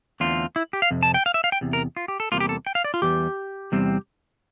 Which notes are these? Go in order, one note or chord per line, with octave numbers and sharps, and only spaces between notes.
E2 D3 A3 C4 F4
E4
G4
F5
F2 C3
A5
G5
F5
E5
F5
G5
E2 C3
A#4
F4
G4
A4
E2 C3 G3 A#3 F4
G4
A4
G5
F5
D5
F4
E2 E3 G3 G4
E2 C3 G3 C4